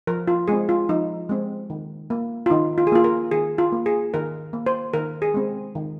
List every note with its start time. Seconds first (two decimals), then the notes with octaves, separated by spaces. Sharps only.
0.07 F3 A#4
0.28 F4
0.48 G#3 C4 G#4
0.69 F4
0.89 F3 D#4
1.29 G#3 C4
1.70 D#3
2.10 A#3
2.46 F4
2.50 D#3 D#4
2.78 F4
2.87 G#4
2.92 A#3 F4
3.04 A#4
3.31 D#3 G#4
3.58 F4
3.72 A#3
3.86 G#4
4.14 D#3 A#4
4.53 A#3
4.67 C5
4.94 D#3 A#4
5.22 G#4
5.34 G#3 C4
5.75 D#3